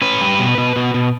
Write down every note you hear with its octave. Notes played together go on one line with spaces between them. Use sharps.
C#4 B4
G3
B2
B2
B2
B2